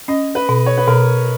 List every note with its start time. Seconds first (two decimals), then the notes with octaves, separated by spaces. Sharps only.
0.08 C#4 D#5
0.35 B4
0.49 B2
0.66 C#5
0.78 B4
0.87 B2 A#4